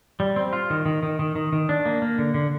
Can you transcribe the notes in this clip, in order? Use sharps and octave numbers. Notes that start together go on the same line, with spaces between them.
G3
C4
F4
D#3
D#3
D#3
D#3
D#3
D#3
D4
A#3
A#3
D3
D3